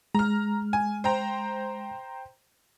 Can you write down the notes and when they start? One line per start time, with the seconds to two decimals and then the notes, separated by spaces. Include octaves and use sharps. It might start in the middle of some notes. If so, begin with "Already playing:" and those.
0.15 G#3 A#5 F6
0.73 G#5
1.04 C5 G5 A#5